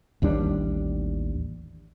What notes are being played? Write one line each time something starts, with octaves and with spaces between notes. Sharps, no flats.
A1 D#2 G3 D4